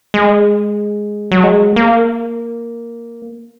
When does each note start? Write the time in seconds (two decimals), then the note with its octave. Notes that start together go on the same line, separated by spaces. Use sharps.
0.14 G#3
1.32 F#3
1.44 G#3
1.76 A#3